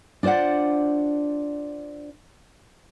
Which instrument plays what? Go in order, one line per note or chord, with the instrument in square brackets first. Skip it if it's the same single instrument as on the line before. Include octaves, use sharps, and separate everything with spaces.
[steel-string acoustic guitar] D4 F4 C5 D5 F#5